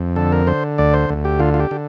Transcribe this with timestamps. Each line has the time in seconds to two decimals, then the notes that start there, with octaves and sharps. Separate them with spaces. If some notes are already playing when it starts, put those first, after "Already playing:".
Already playing: F2
0.16 D3 A4
0.32 A#4
0.47 D3 C5
0.78 D2 D5
0.94 C5
1.09 D2
1.25 G4
1.39 D3 F4
1.54 F4
1.60 G4
1.71 D3